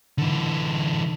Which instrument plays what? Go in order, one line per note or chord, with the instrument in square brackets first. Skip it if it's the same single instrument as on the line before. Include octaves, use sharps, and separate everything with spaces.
[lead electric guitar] D3 E3